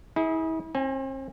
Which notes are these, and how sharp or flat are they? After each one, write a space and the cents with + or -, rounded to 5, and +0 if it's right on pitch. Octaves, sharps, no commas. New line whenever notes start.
E4 -40 G#4 +0
C4 +40 G#5 +0